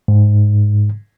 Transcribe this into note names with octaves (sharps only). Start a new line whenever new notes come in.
G#2